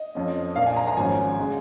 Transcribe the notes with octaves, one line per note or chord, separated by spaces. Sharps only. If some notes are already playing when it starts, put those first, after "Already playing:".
Already playing: D#5
F2 F3 C#4
A#1 A#2 A#3 F5
G#5
A#5
A#5
G#1 G#2 F3 C#4 G#5
C#3 G#3